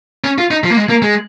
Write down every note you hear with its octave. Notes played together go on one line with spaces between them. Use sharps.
C#4
F4
D#4
F3
A#3
G#3
A#3
G#3